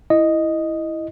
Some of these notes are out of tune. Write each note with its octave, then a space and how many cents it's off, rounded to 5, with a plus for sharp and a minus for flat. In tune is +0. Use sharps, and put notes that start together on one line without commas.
E4 +0 D#5 +0